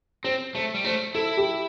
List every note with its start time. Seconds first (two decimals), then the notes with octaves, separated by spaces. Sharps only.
0.24 C4 C5
0.55 A3 C5
0.74 G3
0.84 A3 C5
1.15 E4 A4
1.37 G4